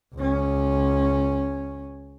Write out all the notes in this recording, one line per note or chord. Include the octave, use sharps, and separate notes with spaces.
C#2 C#4